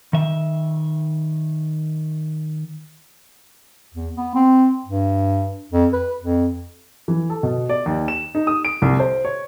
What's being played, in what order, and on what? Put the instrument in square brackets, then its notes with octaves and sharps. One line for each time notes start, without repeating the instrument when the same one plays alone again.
[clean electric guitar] D#3 E5
[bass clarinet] E2
B3
C4
G2
F2
B4
F2
[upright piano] E3
A4
B2
D5
D#2
E7
D#4
D#6
D7
C2
C5
C#5